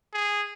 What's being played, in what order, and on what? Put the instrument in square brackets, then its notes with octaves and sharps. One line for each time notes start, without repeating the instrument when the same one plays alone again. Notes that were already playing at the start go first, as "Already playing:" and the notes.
[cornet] G#4